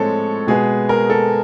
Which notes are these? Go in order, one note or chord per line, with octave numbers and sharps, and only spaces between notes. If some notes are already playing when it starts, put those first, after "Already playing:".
Already playing: A2 F3 G#3 C4 A4 C#5
B2 G#3 B3 G#4
A#4
A4